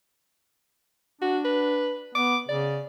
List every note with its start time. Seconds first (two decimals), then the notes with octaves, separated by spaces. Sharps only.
1.22 D4 F#4
1.45 B4
2.15 B3 D6
2.49 C#3 D5